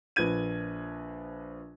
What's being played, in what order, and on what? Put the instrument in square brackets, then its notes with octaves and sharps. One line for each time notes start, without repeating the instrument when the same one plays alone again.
[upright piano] A#1 F3 B4 G#6 D#7